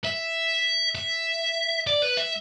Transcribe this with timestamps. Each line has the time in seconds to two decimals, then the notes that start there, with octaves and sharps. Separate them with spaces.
0.04 E5
0.95 E5
1.87 D5
2.02 B4
2.17 E5